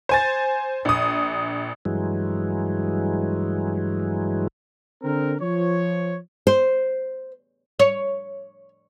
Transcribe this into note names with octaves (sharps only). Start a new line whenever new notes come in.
C5 G#5 A6
A#1 D#6
G2 E3 F#3 G#3
D3 C4 A#4
F3 C#5
C5
C#5